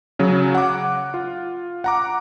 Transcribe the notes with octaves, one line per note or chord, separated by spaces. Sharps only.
C#3 F#3
F#5 D6
F4
F#5 A#5 D6